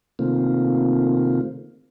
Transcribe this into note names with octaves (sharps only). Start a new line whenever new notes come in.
C3 D#3 A3 A#3 C4 F4